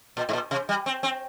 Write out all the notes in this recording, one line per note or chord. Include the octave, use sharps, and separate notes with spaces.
A#2
G#2
A#2
C3
G3
C4
C4